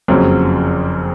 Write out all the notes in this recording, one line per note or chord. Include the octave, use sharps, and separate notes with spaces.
F#1 F2 C#3 F#3 C4